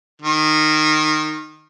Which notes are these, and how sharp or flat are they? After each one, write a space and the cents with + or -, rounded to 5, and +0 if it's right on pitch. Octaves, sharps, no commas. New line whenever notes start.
D#3 -15